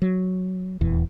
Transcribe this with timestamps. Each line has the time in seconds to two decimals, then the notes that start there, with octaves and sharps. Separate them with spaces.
0.02 F#3
0.81 D#1 E2 E3